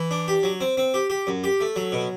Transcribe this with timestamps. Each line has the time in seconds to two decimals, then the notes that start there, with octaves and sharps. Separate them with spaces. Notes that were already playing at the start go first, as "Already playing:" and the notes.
Already playing: E3
0.11 D4
0.28 G4
0.43 F#3
0.61 C4
0.77 C4
0.94 G4
1.10 G4
1.27 F#2
1.44 G4
1.60 A3
1.76 F#3
1.92 B2